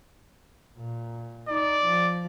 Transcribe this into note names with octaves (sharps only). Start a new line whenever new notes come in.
A#2
D#4 D5
F3